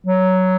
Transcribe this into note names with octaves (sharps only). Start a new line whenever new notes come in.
F#3